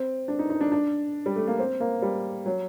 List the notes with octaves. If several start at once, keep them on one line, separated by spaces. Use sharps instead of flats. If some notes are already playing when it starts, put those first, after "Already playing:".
Already playing: C4
D4
D#4
D#4
D4
D4
G3
A3
A#3
C4
A#3
G3
F#3